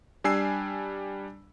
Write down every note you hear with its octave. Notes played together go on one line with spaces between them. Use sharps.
G3 D4 G#5 E6 C7